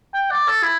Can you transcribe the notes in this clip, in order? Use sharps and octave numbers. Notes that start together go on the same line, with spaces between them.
G5
D5
A4
E4